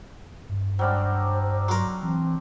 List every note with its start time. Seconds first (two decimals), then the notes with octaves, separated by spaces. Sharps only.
0.49 G2
0.79 F#3 G3 D4 C5
1.68 F#3 A#4 C6
2.03 E3 C4